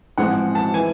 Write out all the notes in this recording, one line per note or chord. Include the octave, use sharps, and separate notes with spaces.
A1 G#2 F3 G#3 C4 F#5
A5
E3 G#5